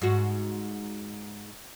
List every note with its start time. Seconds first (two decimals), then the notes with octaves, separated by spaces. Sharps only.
0.02 G#2 F#4